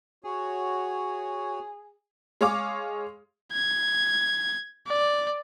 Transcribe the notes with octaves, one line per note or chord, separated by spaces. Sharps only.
F#4 G#4 C#5
G#3 G#4 C#5 F5 D6
G#6
D5